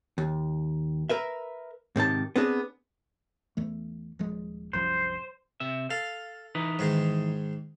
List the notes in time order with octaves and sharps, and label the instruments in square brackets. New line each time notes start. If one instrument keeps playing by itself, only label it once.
[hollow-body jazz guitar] D#2
A#4 B4 E5
G#2 C3 D#3 A5
B3 C4 D4 G#4
[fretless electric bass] E2 E3 A3
D#1 F3 G#3
[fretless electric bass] C2 F#2 F3 [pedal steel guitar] C5
[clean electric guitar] C3 E5
[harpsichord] A4 [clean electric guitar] F5
[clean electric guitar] E3 D#4 B4
[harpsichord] G#2 D#3 G#3